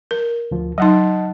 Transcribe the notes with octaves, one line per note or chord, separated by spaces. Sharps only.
A#4
D2 F3
F#3 D#4 D#5 F#5 A5